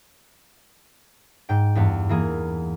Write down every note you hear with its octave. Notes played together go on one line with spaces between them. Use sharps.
G#2 G5
E2 G2 B3
E3 A#3 G#4